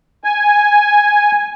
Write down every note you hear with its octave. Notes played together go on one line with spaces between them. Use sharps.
G#5